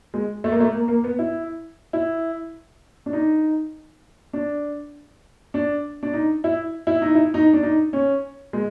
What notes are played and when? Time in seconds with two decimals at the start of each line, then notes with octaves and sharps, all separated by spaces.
0.14 G#3
0.44 A3
0.52 A#3
0.60 A3
0.74 A#3
0.88 A#3
1.04 B3
1.19 E4
1.93 E4
3.06 D4
3.13 D#4
4.33 D4
5.54 D4
6.03 D4
6.14 D#4
6.44 E4
6.87 E4
7.02 D#4
7.15 E4
7.34 D#4
7.53 D4
7.63 D#4
7.93 C#4
8.53 G#3